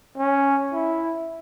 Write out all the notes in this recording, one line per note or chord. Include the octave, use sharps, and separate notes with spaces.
C#4
E4